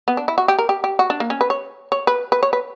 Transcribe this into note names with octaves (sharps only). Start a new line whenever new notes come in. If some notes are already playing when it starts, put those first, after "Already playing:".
B3
D4
E4
F#4
G4
A#4
G4
G4
F#4
D4
A#3
C#4
B4
C#5
C#5
B4
B4
C#5
B4